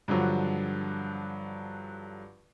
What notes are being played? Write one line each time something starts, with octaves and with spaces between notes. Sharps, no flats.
G2 D3 F3 F#3